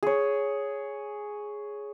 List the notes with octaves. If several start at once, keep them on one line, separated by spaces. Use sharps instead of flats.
G#4 C#5